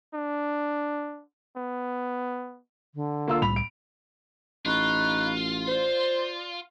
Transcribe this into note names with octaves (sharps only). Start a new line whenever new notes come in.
D4
B3
D3
A#3 F4 E6
C2 A2 G3 B5 F7
D7
A1 D#4 F4 B5 C#6 F#6
C5 D5